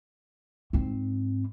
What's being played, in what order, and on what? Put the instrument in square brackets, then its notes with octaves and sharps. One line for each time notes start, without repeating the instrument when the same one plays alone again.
[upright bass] G#2 C4